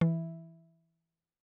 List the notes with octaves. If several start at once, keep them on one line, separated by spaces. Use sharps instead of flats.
E3